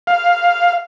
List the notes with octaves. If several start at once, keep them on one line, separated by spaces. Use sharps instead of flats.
F5